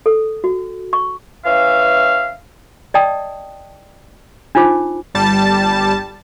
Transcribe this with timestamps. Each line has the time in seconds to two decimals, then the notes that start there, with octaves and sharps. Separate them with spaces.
0.06 A4
0.44 F#4
0.93 C#6
1.45 E3 C#4 E5 F5
2.94 D5 D#5 G5 A5 D#6
4.55 D4 D#4 F4 C5 D6
5.15 G1 G3 A5